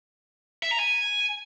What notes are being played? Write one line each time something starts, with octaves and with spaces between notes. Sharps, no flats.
E5
A#5
G#5